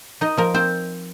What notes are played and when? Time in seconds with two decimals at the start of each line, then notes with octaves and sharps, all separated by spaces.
0.21 D#4 D#5
0.37 F3 A#4
0.54 C4 C5